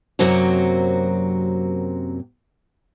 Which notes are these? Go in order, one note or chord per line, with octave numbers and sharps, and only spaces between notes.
F#2 C3 F#3 A#3 C4 F#4